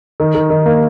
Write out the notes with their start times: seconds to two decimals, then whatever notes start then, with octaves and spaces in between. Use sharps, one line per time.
0.20 D#3
0.35 D#3
0.50 D#3
0.66 A#3